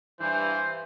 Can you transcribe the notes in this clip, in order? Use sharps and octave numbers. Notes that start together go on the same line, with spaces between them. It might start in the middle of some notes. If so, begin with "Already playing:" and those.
G2 E3 C5